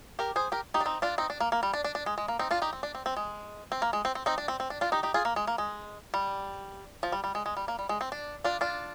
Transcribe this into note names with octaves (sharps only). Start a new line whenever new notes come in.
G4 A#4
G#4 C5
G4 A#4
D#4 G4
D4
C4 D#4
D4 F4
C4 D#4
D4
A#3
A#3
G3
D4
D4
D4
G#3
G#3
A#3
C4 D#4
D4 F4
D#4 G4
C4
D4
C4
C4
G#3
C4
A#3
G#3
C4
C4
C4 D#4
D4
C4
C4
D4
D4 F4
D#4 G4
D#4 G4
F4 G#4
A#3
G#3
A#3
G#3
G3
F3
G3
G3
G#3
G#3
G3
A#3
G3
G#3
C4
D4
D4 F4
D4 F4